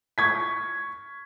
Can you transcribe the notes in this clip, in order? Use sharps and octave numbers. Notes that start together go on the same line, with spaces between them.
C#6 G#6 B6